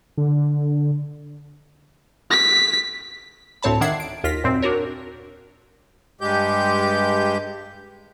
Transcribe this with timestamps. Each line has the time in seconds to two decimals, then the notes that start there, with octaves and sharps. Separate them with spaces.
0.18 D3
2.31 B6
3.62 D2 A2 C4 C#5 A5 B5
3.81 D#3 D4 E5 F#5 G#6 C7
4.00 D7
4.24 D#2 F4 A#6 B6
4.44 F#2 A#2 C4
4.62 D4 F#4 A#4 C#5
6.21 G2 G#3 G4 G6